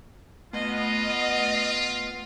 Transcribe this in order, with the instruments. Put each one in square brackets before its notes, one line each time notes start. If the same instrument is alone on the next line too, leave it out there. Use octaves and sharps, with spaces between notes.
[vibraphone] A3 [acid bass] B3 [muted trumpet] F4 [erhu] D#5